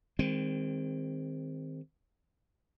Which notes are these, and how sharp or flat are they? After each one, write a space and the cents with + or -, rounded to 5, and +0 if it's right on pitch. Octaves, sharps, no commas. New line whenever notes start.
D#3 +5 G#3 -35 C4 +0